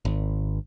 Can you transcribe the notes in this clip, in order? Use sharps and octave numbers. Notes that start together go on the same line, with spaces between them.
G#1